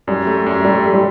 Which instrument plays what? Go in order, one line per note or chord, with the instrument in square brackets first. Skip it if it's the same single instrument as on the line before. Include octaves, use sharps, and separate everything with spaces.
[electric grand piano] F#2 [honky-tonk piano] G3
[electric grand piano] A3
F#2
[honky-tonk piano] G3 [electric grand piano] A3
[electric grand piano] A3
[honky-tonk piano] G3